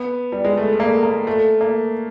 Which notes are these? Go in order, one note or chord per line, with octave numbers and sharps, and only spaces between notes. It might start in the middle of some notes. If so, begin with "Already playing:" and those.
Already playing: B3
G3
G#3
A3
A3
A#3
A#3
A3
A#3